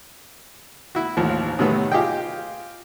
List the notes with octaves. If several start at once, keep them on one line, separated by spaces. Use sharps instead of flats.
E4 F#4
A1 D#2 F3
A2 C3 D#3 F#3 A3 B3
F4 G4 G#4 D#5 G5